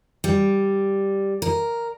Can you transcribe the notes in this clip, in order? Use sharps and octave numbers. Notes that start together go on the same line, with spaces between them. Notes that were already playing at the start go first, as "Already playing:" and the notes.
G3
A#4